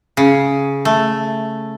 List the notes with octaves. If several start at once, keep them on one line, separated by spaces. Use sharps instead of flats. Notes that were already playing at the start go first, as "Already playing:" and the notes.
C#3
A3